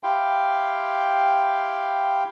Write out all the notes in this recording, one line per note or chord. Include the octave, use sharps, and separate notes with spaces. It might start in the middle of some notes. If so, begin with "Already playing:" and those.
E4 G4 F5 G5 C6